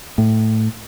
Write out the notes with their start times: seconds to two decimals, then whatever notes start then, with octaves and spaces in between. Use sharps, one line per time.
0.18 A2